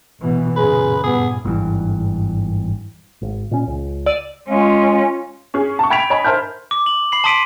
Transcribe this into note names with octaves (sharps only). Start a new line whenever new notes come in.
G#1 B2 E3
F#2 A#2 C#3 G#4 B4
G2 A#2 B3 G#4
G#1 G2 B2 E3
G#1
A#2 C#4
C#2
D5 E6 D#7
G#3 C#4 F4
C#4 G#4
A5 C#6
G5 B5 G#6 B6 D7 F7
C#5 D#5 G#5 B5
A#4 C5 E5 A5 F6 G6
D6
F#7
B5 C7 F#7
A5 C6 D#6 B6 D7 D#7